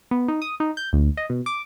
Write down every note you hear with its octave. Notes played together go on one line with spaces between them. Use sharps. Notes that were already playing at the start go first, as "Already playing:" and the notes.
B3
D#4
D#6
D#4
G6
D2
D#5
B2
D6